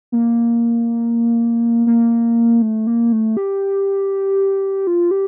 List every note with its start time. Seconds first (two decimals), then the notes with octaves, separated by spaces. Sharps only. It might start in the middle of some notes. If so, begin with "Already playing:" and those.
0.12 A#3
1.87 A#3
2.62 A3
2.87 A#3
3.12 A3
3.37 G4
4.87 F4
5.11 G4